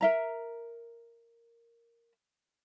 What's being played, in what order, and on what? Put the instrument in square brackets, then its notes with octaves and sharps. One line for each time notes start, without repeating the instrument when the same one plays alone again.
[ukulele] A#4 E5 A#5